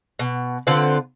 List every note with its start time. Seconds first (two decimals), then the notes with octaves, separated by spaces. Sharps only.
0.19 B2
0.67 D3 C4 F4 B4